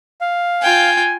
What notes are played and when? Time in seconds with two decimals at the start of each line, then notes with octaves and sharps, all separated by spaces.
0.21 F5
0.62 F4 G5 G#5